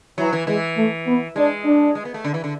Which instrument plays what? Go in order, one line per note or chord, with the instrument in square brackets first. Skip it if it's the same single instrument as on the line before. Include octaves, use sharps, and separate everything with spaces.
[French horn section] E3 [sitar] F#3
[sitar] E3
[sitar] E3 [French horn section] G#3
[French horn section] A3
B3
[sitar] G#3 [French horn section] D4
[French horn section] D4
[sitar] G#3
B3
A3
D3
E3
D3